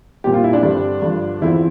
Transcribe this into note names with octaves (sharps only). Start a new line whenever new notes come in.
A#2 G3 C4 G4
F4
E4
D4
G2 D3 G3 C4
G2 D3 F3
E2 D3 F3 C4 E4